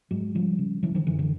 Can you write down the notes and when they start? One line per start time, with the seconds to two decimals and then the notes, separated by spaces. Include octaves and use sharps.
0.11 G#2 F#3 G#3
0.34 C#3 F3 G3
0.59 C#3
0.83 C#3 E3 F#3
0.95 D#3 F3
1.07 F#2 D3 E3
1.19 D3 E3